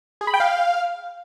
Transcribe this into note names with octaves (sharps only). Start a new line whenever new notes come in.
G#4
B5
G5
F5